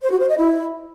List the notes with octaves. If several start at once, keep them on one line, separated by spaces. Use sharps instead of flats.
C5
F#4
C5
D#5
E4